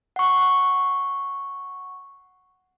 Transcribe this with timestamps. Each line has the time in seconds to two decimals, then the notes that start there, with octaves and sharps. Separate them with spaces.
0.16 F#5 C#6